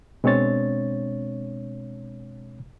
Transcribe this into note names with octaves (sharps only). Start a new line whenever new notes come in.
B2 G#3 C4 D4 C#5 A6